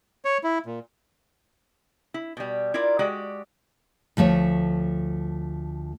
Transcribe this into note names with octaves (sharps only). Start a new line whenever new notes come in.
C#5
E4
A#2
E4
B2 G3
E4 F4 A#4 D5
G#3 F#4 G4 D5
D2 F3 A3 C#5